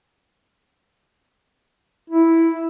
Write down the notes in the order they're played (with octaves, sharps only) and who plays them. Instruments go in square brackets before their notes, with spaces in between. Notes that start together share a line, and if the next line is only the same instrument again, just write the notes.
[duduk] E4